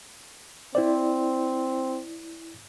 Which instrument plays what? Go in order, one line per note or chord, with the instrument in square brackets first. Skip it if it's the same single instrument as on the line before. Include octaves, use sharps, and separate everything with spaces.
[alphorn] C4 [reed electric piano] E4 C5 D5